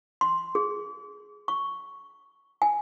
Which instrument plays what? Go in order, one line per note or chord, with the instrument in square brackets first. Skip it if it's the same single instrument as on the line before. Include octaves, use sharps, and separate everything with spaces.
[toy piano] C6
G#4
C#6
G#5